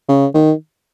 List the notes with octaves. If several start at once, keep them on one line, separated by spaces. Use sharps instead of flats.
C#3
D#3